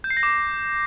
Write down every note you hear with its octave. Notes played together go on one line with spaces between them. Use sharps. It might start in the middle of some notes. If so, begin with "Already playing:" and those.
G6
C7
A#6
D6